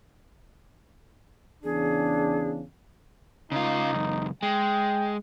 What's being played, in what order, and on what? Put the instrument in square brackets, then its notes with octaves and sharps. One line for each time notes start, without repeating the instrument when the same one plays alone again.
[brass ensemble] E2 C#3 D4 [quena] G#4
[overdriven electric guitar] C#3 F4 [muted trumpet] D#4
[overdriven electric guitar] C#2 F#2
[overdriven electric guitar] G#3 [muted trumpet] G5